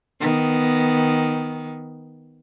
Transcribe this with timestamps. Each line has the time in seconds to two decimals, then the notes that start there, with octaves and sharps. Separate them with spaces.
0.20 D#3 B3